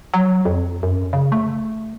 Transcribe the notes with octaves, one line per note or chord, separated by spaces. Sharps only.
F#3
F2
F#2
C#3
A3